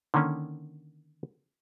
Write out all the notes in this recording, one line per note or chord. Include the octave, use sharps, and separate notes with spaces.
D3 D#3 A#3 C#4